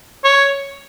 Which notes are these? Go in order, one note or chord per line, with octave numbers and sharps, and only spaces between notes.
C#5